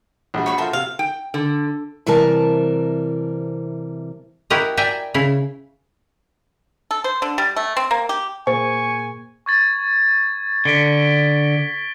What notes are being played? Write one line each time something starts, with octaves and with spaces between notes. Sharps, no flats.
A#1 G3 F#4
C#5 B5 C#6
F4 F#4 A4 A#4 C5 E5
C3 F5
G5
D3
C3 E3 G3 A#4 A5
E4 F#4 G4 A#4 D#5
D5 E5 G5 G#5 A#5
C#3 E4
A4
C5
D3
G3
A3
C4
A#3
G4
A#2 A#3 G#4 C5 G#5 C#6
C#6 G#6 A6
D3 B6 D7 G7